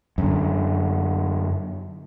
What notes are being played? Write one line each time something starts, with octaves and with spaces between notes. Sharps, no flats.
F#2 D3